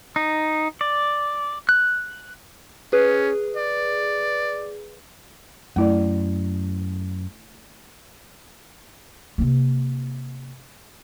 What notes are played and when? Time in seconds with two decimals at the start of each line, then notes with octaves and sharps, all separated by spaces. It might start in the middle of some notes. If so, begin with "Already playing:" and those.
0.16 D#4
0.81 D5
1.69 F#6
2.93 C#4 G#4 B4
3.57 D5
5.76 F#2 A3 E4 D5
9.38 C3 A#3